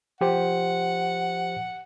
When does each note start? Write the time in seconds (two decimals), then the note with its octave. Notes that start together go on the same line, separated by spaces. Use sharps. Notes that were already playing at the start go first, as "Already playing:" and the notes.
0.21 F3 G4 C5 F#5